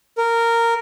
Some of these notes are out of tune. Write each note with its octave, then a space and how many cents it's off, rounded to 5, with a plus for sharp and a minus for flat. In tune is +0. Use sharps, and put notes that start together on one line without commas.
A#4 -10